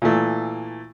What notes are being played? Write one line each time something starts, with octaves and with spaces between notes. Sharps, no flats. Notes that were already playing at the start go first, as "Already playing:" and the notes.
A#2 E3 A3